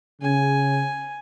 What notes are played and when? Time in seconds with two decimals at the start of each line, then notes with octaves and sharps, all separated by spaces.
0.22 C#3 G#5